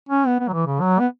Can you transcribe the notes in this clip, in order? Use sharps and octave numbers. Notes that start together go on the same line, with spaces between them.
C#4
B3
B3
F#3
E3
C#3
F#3
B3